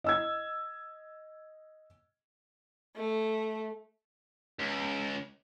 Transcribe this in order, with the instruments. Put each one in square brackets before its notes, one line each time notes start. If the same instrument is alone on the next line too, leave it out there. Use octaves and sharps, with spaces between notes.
[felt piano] D#5 E6 G#6
[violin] A3
[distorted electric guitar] C#2